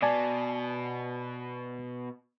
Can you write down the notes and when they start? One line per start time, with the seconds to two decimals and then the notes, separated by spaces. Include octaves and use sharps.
0.02 B2 D5 G#5 A5